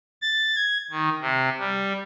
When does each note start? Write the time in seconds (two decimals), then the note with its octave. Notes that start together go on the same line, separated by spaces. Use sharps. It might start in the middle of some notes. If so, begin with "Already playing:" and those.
0.22 A6
0.56 G#6
0.90 D#3
1.21 C3
1.59 G3